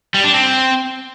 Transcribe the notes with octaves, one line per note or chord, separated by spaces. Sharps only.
G3
D4
C4